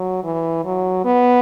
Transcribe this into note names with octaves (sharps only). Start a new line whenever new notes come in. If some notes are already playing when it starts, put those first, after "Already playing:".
Already playing: F#3
E3
F#3
B3